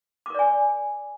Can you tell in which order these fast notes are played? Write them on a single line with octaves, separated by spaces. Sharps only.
D6 A#4 D5 G#5